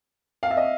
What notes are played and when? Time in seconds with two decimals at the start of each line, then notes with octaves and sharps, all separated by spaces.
0.43 F5
0.51 E5
0.57 D#5